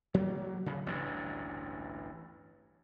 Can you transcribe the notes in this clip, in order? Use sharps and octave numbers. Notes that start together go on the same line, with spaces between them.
F#3 G3 A#3
D1 C#3
A1 D2 G2